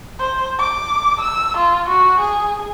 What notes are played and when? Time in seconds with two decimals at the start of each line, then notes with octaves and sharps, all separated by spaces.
0.19 C5
0.59 D6
1.21 E6
1.57 F4
1.88 F#4
2.20 G#4